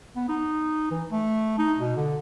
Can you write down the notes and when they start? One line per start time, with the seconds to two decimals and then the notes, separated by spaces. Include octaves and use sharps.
0.16 B3
0.28 D#4
0.91 E3
1.10 A3
1.58 D#4
1.78 B2
1.97 D3